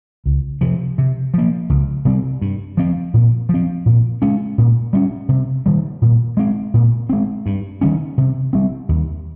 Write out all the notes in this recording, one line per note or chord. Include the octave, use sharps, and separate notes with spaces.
C#2
C3 F3
C3
F3 A#3
C#2
C3 G3 C4
G2
F3 C4
A#2
F3 C4
A#2
G#3 C#4
A#2
G3 A#3 C#4
C3
D#3 G3
A#2
G#3 C4
A#2
G#3 C4
G2
D#3 G3 C#4
C3
G3 C4
D#2